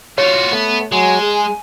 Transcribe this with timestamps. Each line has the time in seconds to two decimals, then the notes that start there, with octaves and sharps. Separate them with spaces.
0.18 F4 F#4 C#5
0.52 A3 B3
0.92 F#3 G#3 G#5
1.22 G#4